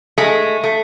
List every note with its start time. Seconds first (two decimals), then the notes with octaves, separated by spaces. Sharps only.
0.18 G#3 A3
0.64 A3